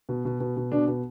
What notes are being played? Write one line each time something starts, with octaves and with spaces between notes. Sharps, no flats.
B2
B2
B2
B2
B2 D4
B2